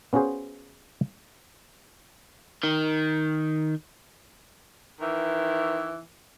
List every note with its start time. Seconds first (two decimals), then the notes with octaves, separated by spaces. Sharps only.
0.13 B3 C#4 F4 F#4 G#4 C5
2.63 D#3
5.00 D#3 E3